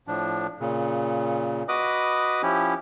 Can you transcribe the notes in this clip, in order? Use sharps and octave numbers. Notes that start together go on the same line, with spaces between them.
A2 F3 D4
A#2 C#3
F#4 B4 D#5 B5 D6 D#6
F3 C#4 E4 G4